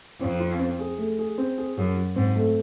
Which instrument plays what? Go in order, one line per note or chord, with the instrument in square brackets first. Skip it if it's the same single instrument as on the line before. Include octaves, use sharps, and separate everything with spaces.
[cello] F2 [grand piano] C4
[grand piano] F4
C4
G#4
A3
G#4
C4
G#4
[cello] F#2 [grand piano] F#3
[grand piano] F#3
[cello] G#2 [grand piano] C4
[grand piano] A3